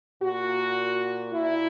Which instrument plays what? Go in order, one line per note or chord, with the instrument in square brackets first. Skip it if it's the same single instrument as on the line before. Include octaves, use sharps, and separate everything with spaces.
[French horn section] A#2 F#4
A#2 E4